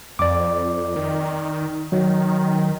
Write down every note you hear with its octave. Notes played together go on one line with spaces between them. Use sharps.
F2 D5 D6
D#3
D#3 F#3